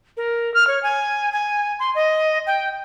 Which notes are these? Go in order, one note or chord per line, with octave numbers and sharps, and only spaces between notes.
A#4
F6
C#5
G#5
G#5
C6
D#5
G5